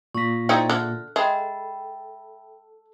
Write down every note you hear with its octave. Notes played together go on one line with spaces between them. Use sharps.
A#2 C#6 A#6 B6
C4 D#4 E4 G#4 D5 E5
D3 F6 F#6
G#3 A4 E5 G5 B5